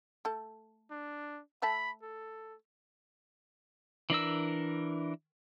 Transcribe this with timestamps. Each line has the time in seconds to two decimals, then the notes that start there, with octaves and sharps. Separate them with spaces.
0.25 A3 A4
0.91 D4
1.62 A3 E5 A5 B5
2.02 A4
4.10 E3 D4 A#4 E6